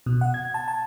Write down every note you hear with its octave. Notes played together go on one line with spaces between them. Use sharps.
B2
F#5
G#6
A5
A5